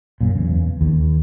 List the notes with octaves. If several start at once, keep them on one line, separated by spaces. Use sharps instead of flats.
F#2 A#2
E2 C#3
D#2